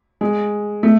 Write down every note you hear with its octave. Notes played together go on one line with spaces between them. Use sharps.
G#3
A3